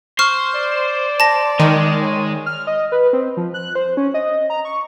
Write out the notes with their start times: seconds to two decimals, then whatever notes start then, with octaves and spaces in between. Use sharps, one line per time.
0.19 C5 C#6 F6
0.55 D5
1.20 A5 A#6
1.59 D#3 G#3
2.02 C#5
2.46 F6
2.67 D#5
2.92 B4
3.13 C4
3.37 F3
3.54 F#6
3.75 C5
3.97 C#4
4.14 D#5
4.50 A#5
4.65 C#6